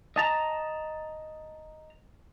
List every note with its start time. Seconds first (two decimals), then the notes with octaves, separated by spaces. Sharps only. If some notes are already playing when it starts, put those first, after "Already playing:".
0.16 D#5 A5 A#5